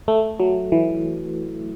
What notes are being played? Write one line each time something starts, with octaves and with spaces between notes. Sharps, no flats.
A3
F#3
E3